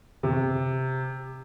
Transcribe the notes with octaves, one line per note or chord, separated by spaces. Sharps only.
C3